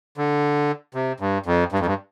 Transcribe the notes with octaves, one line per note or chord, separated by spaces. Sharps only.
D3
C3
G2
F2
G2
F2
G2